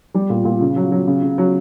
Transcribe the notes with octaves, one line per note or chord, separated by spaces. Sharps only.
G3
A#2
A#2
C#3
F#3
F#3
C#3
C#3
F#3